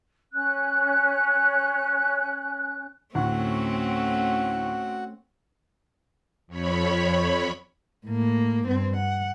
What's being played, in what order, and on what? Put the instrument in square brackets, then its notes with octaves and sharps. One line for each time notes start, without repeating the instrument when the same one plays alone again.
[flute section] C#4 F#6
[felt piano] D2 A2 [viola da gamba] A3 C4 C#4 [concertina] F#4 F#5
[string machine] F2 C#5 B5
[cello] A2 A#3
G2 C4
F#5